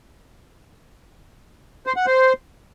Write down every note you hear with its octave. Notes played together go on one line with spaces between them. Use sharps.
C5
F#5
C5